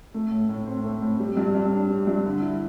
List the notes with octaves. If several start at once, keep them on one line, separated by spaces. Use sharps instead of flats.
A3
A2
A2
C4
A3
A2
G3
G2
G2
D4
G3
G2
D3
E4